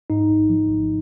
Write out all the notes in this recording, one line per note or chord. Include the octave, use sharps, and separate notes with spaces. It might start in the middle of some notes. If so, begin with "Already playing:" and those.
G#2 D#4
G#1
F3
G#1